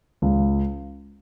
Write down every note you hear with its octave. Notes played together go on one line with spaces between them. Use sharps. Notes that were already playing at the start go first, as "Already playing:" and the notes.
C#2